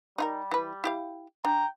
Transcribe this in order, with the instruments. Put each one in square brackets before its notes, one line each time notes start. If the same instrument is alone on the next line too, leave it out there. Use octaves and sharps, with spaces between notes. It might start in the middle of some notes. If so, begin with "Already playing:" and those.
[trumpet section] G3 [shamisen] D#4 F4 A#4
[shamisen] E3 B4
E4 G4 F5
[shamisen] D4 [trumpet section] G5 A#5